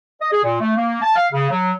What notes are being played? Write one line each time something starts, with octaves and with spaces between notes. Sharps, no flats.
D#5
G#4
A#2
A3
A#3
A5
F5
C#3
F#3